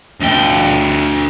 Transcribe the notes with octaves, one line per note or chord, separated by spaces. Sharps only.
D2 G5